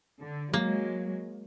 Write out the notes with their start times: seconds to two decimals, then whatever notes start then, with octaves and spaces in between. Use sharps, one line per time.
0.22 D3
0.53 F#3 G#3 A#3